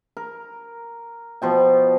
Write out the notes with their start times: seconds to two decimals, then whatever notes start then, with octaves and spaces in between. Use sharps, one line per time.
0.17 A#4
1.42 B2 F3 G5